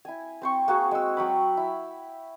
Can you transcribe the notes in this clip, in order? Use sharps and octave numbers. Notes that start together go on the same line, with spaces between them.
E4 G#5
C4 C5 C#6
A#3 F#4 G#4
G#3 E6
F#3 G5 B5
E4